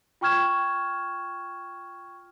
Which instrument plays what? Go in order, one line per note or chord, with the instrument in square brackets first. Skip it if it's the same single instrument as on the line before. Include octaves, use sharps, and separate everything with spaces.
[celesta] F4 G5 C#6 F6 G#6 E7